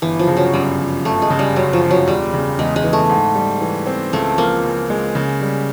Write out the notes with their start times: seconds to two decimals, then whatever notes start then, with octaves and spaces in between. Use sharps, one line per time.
0.02 G1 E3
0.19 F3
0.27 C#3
0.37 F#3
0.53 F#2 G3
0.79 F3
1.05 G1 A3
1.22 G#3
1.30 C#3
1.39 G3
1.56 F#2 F#3
1.73 F3
1.81 G1
1.91 F#3
2.07 E1 G3
2.33 C#3
2.59 E2 G#3
2.76 G#3
2.84 E3
2.93 A3
3.10 G#2
3.35 G3
3.61 E3
3.87 C4
4.13 C#2 A3
4.38 F3 A#3
4.64 C#3
4.90 G#3
5.15 C#3
5.41 G3